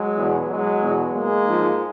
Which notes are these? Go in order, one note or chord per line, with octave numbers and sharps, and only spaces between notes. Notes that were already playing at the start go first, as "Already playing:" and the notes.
Already playing: F#3 G#3
E2 B2
F#3 G#3
E2 B2
G#3 A#3
G#2 F3